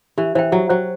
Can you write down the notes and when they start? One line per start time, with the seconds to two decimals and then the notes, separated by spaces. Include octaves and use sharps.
0.18 E3 G4
0.35 E3 C5 G5
0.52 F#3 G4
0.70 F#3 C5 G5